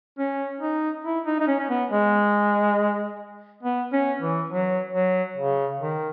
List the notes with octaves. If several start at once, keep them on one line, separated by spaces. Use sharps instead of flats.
C#4
D#4
E4
D#4
D#4
C#4
C#4
B3
G#3
B3
C#4
E3
F#3
F#3
C#3
D#3